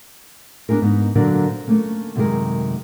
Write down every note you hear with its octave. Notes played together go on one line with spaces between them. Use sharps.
B3 D4 G4 G#4 A#4
G#2 B3 D#4
A#2 D3 F#3 F#4 A#4 D5
C5
A3 A#3 C#4
F#2 C3 D#3 G#3 G#4 A#4